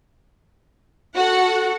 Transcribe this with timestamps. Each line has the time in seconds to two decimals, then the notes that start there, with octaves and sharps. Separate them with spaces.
1.15 F#4 A4 F#5